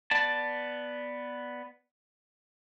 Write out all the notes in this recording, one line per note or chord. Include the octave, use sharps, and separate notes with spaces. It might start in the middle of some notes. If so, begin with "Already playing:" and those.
B3 D5 A5